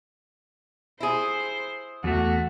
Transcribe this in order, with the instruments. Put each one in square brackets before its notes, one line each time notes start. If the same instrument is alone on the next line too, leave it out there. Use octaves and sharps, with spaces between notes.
[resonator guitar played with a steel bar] E4 G#4 [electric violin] C5
[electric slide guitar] E2 A3 [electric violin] F#4